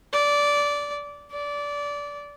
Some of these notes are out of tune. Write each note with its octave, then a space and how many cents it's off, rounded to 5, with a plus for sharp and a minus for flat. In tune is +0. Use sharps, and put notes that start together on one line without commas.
D5 -15
D5 -20